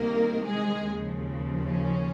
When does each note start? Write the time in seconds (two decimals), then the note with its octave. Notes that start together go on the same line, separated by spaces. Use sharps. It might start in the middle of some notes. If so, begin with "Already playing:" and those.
Already playing: C2 C3 D#3 A#3 A#4
0.46 G#3 G#4
0.86 D#2 C#3 F3
1.65 C#4